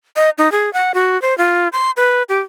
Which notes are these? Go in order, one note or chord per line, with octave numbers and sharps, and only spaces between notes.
D#5
D#4
G#4
F#5
F#4
C5
F4
C6
B4
G4